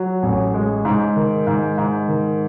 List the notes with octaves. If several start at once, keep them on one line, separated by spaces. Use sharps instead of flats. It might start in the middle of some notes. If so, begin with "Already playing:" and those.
Already playing: F#3
A1
G#3
G#2
D#3
G#2
G#2
D#3